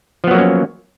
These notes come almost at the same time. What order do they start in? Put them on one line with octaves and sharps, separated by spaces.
F3 B3 F#3 A#3 C#4